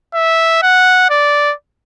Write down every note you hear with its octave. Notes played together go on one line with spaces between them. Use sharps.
E5
F#5
D5